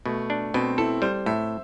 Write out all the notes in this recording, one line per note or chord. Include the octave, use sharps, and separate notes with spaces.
B2 A3
D4
B2 C4
E4 A4
G3 C5
A2 E5